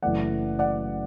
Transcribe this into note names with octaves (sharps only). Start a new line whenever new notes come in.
F#1 F#2 E3 A3 D5 F#5
D5 F#5